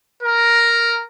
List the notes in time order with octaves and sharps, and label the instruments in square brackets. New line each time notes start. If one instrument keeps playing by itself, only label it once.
[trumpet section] A#4